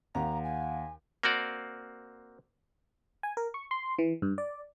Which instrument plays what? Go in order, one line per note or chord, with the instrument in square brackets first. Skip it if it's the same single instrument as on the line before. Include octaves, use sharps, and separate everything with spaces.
[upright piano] D#2 [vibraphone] F5 F#5 [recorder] A#5
[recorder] G#5
[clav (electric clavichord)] A#3 C4 F#4 D5
[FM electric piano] G#5
A#4
C#6
C6
E3
G2
D5